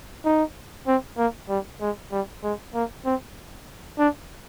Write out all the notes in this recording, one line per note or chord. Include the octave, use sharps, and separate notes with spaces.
D#4
C4
A#3
G3
G#3
G3
G#3
A#3
C4
D4